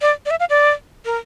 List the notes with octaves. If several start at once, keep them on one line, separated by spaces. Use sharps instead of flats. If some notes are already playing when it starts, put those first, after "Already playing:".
D5
D5
E5
F5
D5
A#4